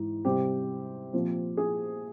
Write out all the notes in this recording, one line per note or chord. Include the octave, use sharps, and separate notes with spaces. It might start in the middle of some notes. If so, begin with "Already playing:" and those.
Already playing: G#2 E3
C3 G3 C4 G4
A#2 F3 C4
G#4